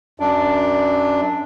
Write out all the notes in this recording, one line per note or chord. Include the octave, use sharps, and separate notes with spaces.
F#2 D4